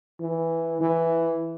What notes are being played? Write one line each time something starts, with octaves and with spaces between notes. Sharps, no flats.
E3
E3